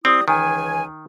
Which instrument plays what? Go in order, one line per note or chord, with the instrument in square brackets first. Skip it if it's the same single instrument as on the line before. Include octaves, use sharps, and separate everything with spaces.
[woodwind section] G3 E4 D#6 [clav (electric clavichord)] C4
[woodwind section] C#2 E3 G#5 [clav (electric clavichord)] D#3